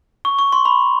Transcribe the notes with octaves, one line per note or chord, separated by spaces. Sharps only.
C#6
C#6
C6
B5